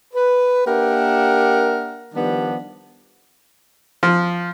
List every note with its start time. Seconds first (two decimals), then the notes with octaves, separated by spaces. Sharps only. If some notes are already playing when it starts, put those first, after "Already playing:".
0.14 B4
0.66 A#3 D4 G4 A#4 E5 F#5
2.14 D#3 F3 G3 B3 D4
4.03 F3